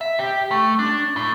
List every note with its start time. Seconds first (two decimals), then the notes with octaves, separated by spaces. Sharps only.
0.01 E5
0.19 G4
0.51 A3
0.79 D4
1.16 A2